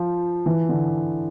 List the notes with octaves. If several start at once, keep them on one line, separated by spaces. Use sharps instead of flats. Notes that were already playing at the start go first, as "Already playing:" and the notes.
Already playing: F3
E3
D3